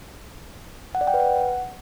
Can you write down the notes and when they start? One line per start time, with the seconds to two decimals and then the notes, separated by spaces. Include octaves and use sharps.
0.95 F#5
1.01 D5
1.07 G5
1.14 B4
1.20 F#5